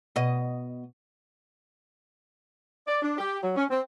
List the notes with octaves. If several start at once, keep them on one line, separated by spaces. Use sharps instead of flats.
B2 D#5
D5
D4
G4
F#3
C#4
C4